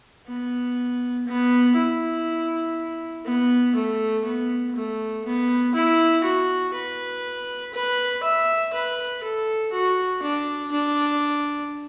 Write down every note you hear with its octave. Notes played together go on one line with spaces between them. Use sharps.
B3
B3
E4
B3
A3
B3
A3
B3
E4
F#4
B4
B4
E5
B4
A4
F#4
D4
D4